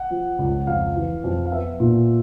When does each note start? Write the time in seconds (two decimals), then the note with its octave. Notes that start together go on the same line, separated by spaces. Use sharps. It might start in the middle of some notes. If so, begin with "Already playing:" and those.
Already playing: F#5
0.10 F3
0.39 C#2
0.67 F2 F5
0.96 E3
1.24 F2
1.45 F5
1.51 B3 E5
1.80 A#2